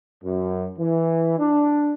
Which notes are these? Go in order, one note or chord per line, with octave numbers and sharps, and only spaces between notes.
F#2
E3
D4